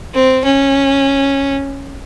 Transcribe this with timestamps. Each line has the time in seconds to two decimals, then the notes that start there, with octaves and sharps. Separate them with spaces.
0.14 C4
0.45 C#4